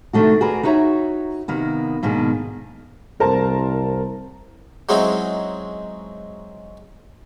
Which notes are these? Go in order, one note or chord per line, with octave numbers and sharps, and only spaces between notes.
C3 D#3 A3 D4 F#4
F#4 G#4 A#4 B4 D5
D#4 E4 F#4 C#5 E5 A#5
C3 D#3 A#3 B3
G#2 B2 D#3 A#3 D4 G#4
C2 A#4 C5 A5
F#3 G#3 C4 C#4 D#4 E4